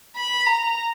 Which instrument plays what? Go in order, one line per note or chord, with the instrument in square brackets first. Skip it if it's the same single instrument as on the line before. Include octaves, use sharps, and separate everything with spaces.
[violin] B5
A#5